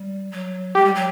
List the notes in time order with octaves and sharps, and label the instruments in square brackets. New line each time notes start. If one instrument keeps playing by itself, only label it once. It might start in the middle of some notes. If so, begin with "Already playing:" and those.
Already playing: [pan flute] G3
F#3
[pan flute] G#3 [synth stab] G4
[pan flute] G3
F#3